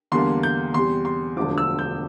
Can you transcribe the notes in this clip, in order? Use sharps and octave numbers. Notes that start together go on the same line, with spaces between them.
E2 D3 G3 A#3 C6
G6
E2 C3 G3 C6
C6
E1 D2 D3 F3 D6
E6
G6